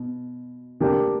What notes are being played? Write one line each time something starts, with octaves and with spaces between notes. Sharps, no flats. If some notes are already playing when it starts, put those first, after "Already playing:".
Already playing: B2
D3 A#3 D4 G4